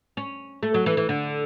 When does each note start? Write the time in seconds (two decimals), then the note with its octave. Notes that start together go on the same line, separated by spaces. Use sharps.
0.17 C#4
0.63 A3
0.74 F#3
0.86 E3
0.97 E3
1.09 D3